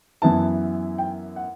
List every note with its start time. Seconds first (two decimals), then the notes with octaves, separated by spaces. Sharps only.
0.22 F#2 E3 B3 E4 A5
0.98 G5
1.36 F#5